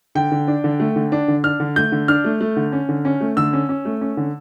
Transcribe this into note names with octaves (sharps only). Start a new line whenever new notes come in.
D3 G5
D3
D4
D3
A3
D3
D4
D3
D4 F6
D3
A3 G6
D3
D4 F6
A3
A3
D3
C#4
D3
C#4
A3
D3 E6
C#4
C#4
A3
C#4
D3